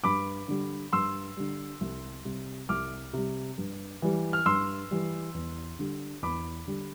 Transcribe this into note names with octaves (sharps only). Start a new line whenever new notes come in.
G2 B5 D6
D3 G3
G2 C6 E6
D3 G3
C2
C3 G3
C2 D6 F6
C3 G3
G2
E3 G3
F6
G2 C6 E6
E3 G3
E2
D3 G3
E2 B5 D6
D3 G3